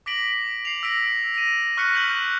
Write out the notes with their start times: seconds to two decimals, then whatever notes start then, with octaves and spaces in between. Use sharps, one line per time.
0.06 D6 A#6 B6 D7 F#7
0.65 C7 F7
0.83 E6 A#6 B6 D7 F#7
1.34 A#6 D#7
1.77 C#6 F6 F#6 A#6 B6 C#7
1.95 F6 G6 F#7